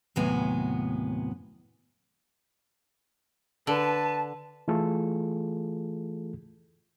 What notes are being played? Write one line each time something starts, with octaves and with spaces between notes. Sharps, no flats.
D#2 A2 C3 F#3 B3 G#5
D3 B4 A5
E3 A3 F4 G#4 A4